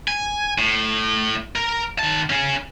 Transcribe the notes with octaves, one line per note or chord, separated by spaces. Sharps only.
G#5
A2
A#4
D#3 A5
C#4 G#4